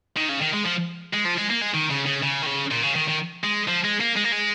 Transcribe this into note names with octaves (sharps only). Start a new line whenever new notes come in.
D#3
C#3
D#3
G#3
F3
G#3
F3
G#3
A#3
G#3
D#3
C#3
C#3
C#3
D#3
C#3
A#2
C#3
D#3
D#3
G#3
F3
G#3
A#3
G#3
A#3
G#3